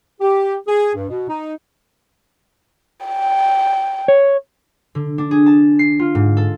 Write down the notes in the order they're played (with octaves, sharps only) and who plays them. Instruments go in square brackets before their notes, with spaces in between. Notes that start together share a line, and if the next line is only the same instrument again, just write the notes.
[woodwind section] G4
G#4
G2
B2
D#4
[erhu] G5
[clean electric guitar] C#5
[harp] D3
D4
G#4
A5
C7
F4
G#2
A4